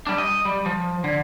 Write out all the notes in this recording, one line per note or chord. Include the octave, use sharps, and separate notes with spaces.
G3 D4
D#5
G3
F3
D3